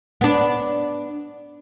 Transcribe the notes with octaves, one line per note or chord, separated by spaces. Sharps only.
B3 D4